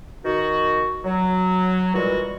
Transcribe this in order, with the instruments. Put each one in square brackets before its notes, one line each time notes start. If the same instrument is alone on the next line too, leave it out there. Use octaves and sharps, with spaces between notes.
[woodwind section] D#3 F#4
F#3
A#2 E3 G3 G#3 F#4